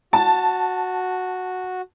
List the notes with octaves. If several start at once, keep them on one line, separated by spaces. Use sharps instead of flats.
F#4 A5